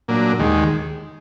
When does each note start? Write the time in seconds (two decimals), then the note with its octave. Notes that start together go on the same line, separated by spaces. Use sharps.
0.08 A#2 F#3 A#3 D4
0.39 D#2 D#3 G#3